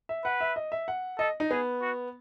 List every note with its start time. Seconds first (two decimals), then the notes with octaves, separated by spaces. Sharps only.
0.09 E5
0.25 B4 F#5
0.41 E5
0.56 D#5
0.72 E5
0.88 F#5
1.19 A4 D#5
1.40 D#4
1.51 B3 G#4
1.82 F#4